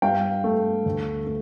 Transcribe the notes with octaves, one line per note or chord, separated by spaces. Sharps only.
G2 F5 G5
A3
D2
A3